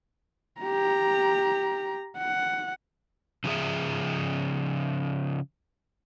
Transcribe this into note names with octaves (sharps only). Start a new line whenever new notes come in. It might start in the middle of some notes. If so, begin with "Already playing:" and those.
G4 A#5
F#5
C#3 F3 F#3 G#4 E5